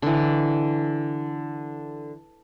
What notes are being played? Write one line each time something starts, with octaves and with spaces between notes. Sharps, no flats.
D3 E3